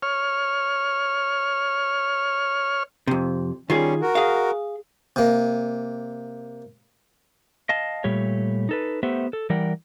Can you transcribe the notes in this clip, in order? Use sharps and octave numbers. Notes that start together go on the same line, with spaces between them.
C#5 F6
F2 C3
D#3 G3 C#4 F4 G#4
F#4 A#4
G#4 F5
C3 A#3
D#5 F5 A5
A#2 G3 A3 G4 C#5
D#4 A4 B4
A3 B3 G4 C5 E5 F#5
A4
E3 G3 A#4 D5 F#5 G5